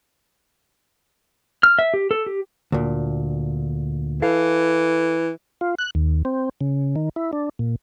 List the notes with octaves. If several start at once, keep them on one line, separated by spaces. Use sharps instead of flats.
F6
E5
G4
A4
G4
D2 A#2
E3 A4 F5
F4
F#6
D#2
C4
C#3
D#3
E4
D4
A#2